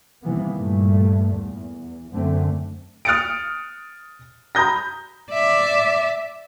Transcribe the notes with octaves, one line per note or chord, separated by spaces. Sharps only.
C3 D#3 E3 G3 A#3 B3
G2 A#2 G3 A3
E2
F#2 D3 A3 C4
D#6 F6 F#6 A6 C#7 D7
A#5 B5 D#6 G6 A#6
D5 E5